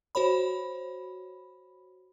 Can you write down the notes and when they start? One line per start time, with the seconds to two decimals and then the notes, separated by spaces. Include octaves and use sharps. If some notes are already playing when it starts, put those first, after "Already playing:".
0.15 F#4 C5 C#5 B5